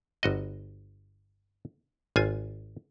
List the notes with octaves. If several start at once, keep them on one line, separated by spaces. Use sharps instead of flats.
G1 F#4 D#5
G#1 F4 G#5